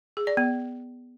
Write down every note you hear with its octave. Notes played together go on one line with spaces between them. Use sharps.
G#4
D5
B3